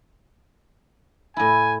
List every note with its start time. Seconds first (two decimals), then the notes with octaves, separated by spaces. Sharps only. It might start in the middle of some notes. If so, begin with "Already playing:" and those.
1.37 A2 E4 G#5